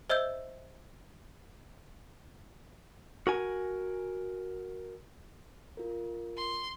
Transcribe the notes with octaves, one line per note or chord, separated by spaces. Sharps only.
C5 D#5 E5 E6 G6
F#4 A#4 G#5
F4 A#4
C6